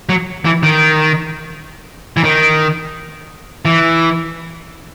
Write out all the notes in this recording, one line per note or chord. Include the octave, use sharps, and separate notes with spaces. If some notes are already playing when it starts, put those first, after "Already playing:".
F#3
E3
D#3
E3
D#3
E3